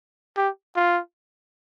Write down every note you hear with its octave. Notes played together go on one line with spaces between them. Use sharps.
G4
F4